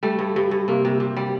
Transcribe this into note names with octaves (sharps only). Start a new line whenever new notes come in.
G3 A3
G2
G2
G2
C3 A#3
C3
C3
G3